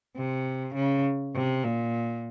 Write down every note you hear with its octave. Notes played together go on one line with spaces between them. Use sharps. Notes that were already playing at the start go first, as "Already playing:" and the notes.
C3
C#3
C3
A#2